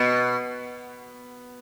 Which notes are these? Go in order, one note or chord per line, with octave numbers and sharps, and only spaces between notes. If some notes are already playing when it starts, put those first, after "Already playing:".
Already playing: B2 B3